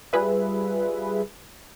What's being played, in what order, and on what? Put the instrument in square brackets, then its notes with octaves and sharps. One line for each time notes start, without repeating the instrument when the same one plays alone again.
[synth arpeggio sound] G3 F4 G#4 B4 E5